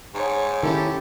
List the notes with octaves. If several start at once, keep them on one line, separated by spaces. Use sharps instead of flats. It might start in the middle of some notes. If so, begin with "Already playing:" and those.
G#2 C#5
D#3 C#4 E4 G4 A4 A5